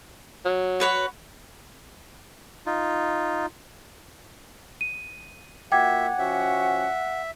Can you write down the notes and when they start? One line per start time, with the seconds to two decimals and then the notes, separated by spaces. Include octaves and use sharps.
0.45 F#3
0.80 F#4 B4 C#5
2.66 D#4 F4
4.81 D#7
5.72 A#3 F4 F#4 E5 F#5 G5 D6 G#6
6.19 F3 C#4 F#4 E5